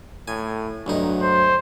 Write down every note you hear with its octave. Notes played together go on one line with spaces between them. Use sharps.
A2 G#5
D2 G2 F#3 D#4
C5